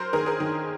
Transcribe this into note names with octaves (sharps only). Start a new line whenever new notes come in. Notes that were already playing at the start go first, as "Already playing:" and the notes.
Already playing: F#3 A#4 C5
D#3 G#4 A#4
G#4 A#4
D#3